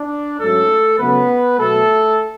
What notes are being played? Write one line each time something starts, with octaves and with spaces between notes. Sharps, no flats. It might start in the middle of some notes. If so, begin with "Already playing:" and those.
Already playing: D4
G#2 F#3 A3 C#4 A4
C#3 F#3 A3 B3 C#4 B4
B2 F#3 A3 B3 A4